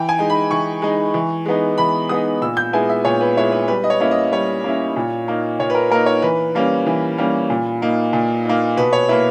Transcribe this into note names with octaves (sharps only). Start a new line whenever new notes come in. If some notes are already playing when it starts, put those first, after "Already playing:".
Already playing: E3 G5
G#5
G#3 D#4
B5
E3 C#6
G#3 D#4
E3
G#3 B3 D#4
E3 B5
G#3 B3 D#4 D#6
A#2 E6
G6
G#3 B3 E4 G#5
E5
A#2 C#5
B4
G#3 B3 E4 C#5
B4
G3 B4
D#5
C#5
A#3 C#4 E4 C#5
D#5
G3 C#5
A#3 C#4 E4
A#2
A#3 D#4
A#2 C#5
B4
A#4
A#3 D#4 A#4
C#5
E3 B4
G3 A#3 C#4
E3
G3 A#3 C#4
A#2
A#3 D#4
A#2
A#3 D#4
B2 B4
C#5
A#3 E4 B4